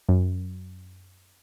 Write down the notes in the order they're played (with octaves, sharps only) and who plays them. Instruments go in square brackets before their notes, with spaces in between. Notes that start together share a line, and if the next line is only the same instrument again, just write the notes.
[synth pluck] F#2